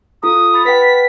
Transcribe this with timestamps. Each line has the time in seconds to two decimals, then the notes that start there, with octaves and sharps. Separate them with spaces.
0.23 F4 A4 A#5 D#6
0.54 B5 A6 C#7
0.65 B4 F#5 G5 B6